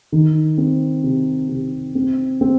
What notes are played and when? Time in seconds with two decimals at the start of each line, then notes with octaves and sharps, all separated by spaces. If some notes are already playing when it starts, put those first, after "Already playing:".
0.12 D#3
0.58 C4
1.03 C3
1.49 C3
1.95 C4
2.41 C4